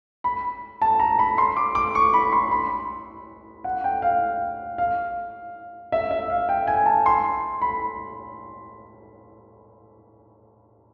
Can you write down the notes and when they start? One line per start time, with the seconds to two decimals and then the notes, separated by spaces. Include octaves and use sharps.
0.24 B5
0.82 A5
1.00 A#5
1.19 B5
1.38 C6
1.57 D6
1.75 D6
1.95 C#6
2.14 B5
2.32 C6
2.51 B5
3.64 F#5
3.84 G5
4.02 F5
4.78 F5
5.92 E5
6.11 E5
6.30 F5
6.49 G5
6.67 G#5
6.86 A5
7.06 C6
7.62 B5